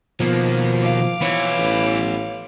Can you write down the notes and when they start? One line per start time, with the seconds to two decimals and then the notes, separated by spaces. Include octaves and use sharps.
0.20 B2 D#3 F3 A#3
0.81 F5 D6
1.21 E3 B3 C#5
1.58 A1